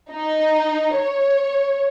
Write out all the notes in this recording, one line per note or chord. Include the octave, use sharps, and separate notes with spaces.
D#4
C#5